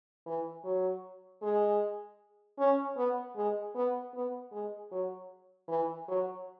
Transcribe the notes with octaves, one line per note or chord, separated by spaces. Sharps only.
E3
F#3
G#3
C#4
B3
G#3
B3
B3
G#3
F#3
E3
F#3